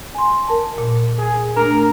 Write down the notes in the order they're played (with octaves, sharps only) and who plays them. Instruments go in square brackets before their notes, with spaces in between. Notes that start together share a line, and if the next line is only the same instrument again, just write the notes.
[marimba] G#5 C6
A#4 A5
A#2
[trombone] G#4
[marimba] A3 D4 [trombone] A#4